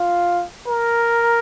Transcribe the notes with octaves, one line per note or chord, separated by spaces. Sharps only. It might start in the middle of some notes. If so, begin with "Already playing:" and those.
Already playing: F4
A#4